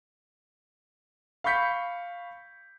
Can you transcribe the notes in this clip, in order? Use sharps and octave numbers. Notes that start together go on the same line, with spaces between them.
F5 B5 C#6 G6 B6 C#7